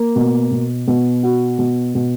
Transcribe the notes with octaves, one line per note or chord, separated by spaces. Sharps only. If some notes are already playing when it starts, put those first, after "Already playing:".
Already playing: A#3
B2
B2
B2
F#4
B2
B2